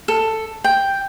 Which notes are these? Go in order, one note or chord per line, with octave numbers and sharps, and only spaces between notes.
A4
G5